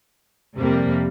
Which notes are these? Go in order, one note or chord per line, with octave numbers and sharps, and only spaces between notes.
F2 C3 G3 A#3